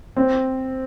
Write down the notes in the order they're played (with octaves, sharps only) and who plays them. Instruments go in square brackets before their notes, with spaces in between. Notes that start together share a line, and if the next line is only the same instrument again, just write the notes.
[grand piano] C4